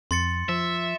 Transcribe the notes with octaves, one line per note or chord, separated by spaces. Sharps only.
F2 C6 A6 C#7
F3 E5